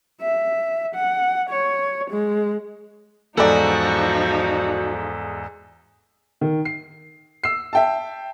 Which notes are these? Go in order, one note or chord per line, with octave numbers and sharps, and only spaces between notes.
E5
F#5
C#5
G#3
E2 G#2 F3 D#4 F#4 A4 D5
D#3
C7
E6 C7
E5 G5 A5